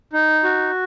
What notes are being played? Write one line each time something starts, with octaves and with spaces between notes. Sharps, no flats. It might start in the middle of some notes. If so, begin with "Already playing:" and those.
D#4
F#4